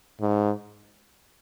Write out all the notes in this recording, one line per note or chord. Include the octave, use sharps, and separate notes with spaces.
G#2